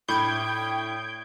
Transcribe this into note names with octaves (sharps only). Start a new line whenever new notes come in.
A2 D4 G5 B5 G6 G#6 D7